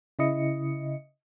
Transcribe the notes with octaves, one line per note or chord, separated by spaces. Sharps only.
C#3 E4 D#5 C#7